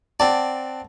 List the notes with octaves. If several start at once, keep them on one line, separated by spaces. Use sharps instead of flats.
C4 D5 F#5 A5